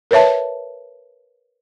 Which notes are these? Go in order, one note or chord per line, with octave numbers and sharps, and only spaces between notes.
A#4 B4 C#5 E5 A5